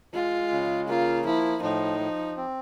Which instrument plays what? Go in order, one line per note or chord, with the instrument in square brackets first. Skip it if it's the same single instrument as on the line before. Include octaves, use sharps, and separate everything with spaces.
[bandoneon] G#3 [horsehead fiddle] F4
[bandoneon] C#3
[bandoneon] A#3 [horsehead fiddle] F4
[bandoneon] F3 [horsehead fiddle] E4
[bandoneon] A2 [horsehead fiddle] D#4
[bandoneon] F3
C4